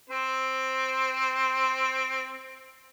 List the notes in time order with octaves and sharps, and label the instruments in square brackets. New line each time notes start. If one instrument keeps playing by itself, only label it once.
[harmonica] C4 C5